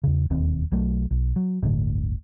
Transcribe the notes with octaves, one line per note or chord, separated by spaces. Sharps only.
E2 C#3
E1 D#2 C4
B1 F#3 A3
B1
F#3
D1 G1 A2 D3